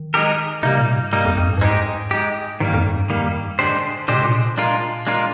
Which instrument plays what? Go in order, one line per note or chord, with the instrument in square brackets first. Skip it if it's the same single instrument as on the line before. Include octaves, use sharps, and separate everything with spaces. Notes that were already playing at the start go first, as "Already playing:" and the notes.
Already playing: [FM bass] D#3
[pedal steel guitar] G#3 D#4 G4 A#4
[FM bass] C3 [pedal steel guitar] G3 A#3 D#4
[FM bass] A#2
G#2
[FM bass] G2 [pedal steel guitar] G3 A#3 D#4
[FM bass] F2
F2
G#2
G2
[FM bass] G#2 [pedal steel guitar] G#3 D#4 G4
[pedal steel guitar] G#3 D#4 G4
[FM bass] G#2 [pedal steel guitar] D#3 G3 A#3
[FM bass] F2
G#2
G2
[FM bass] F2 [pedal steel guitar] D#3 G3 A#3
[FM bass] G2
[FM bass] G#2 [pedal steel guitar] D3 G#3 D4 G4 C5
[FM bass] A#2
G#2
[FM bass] A#2 [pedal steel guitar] D3 G#3 D4 G4 C5
[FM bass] C3
A#2
[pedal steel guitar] G#3 D4 F4 A#4
G#3 D4 F4 A#4